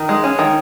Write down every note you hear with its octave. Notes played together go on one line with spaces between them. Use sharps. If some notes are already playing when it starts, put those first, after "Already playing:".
Already playing: D#3
G#3
C#4
D#3